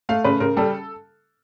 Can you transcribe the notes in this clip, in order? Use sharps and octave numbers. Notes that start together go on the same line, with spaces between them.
A3 F5
C#3 B4
C#3 A#4
G3 A4